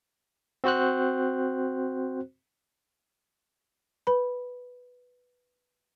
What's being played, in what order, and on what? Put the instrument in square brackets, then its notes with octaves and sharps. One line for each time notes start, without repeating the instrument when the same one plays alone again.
[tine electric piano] C4 F#4 C5 F#6
[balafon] B4 B5